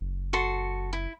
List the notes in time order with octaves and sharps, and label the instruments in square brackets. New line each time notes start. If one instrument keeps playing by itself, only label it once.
[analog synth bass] F#1
[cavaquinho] F#4 A4 C6
E4